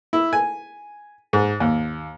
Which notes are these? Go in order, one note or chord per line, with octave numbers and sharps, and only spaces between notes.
E4
G#5
G#2
D#2